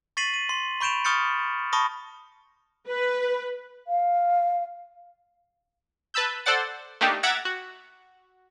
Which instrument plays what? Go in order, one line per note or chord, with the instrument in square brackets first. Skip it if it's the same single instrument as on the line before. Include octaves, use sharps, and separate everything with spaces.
[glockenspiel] C#6 A6 B6 C7 D#7 F#7
D#7
C6
B5 C#6 G6 D7 E7 F7
C#6 D#6 F6 G6 A6 C#7
A5 B5 C#6 D#6 A#6
[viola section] B4
[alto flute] F5
[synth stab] B4 A5 B5 E6 G6
A4 C5 D5 F#5 A6
A3 A#3 D4 D#4 G4
E5 F#5 A#5 D6 G#6 A6
F#4